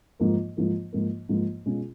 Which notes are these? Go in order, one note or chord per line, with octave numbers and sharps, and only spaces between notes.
G#2 F3 A#3
G#2 F3 A#3
G#2 F3 A#3
G#2 F3 A#3
B2 G#3 C#4 F4